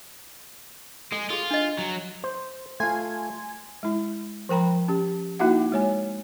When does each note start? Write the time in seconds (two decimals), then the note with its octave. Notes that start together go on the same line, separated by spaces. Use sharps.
1.12 G#3 A4
1.30 F4 G#4 A4
1.51 D4 D#5
1.79 F#3
2.24 C5
2.80 A3 F4 G#5 C6 G#6
3.83 G#3 E4
4.49 F3 A#4 G5 A#5 B5
4.88 C#4 G4
5.39 A#3 D#4 E4 F#4 E5 F#5
5.72 G#3 C#5 G#5